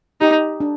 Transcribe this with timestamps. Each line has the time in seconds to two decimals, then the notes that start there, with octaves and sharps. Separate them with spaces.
0.21 D#4 G4
0.60 D4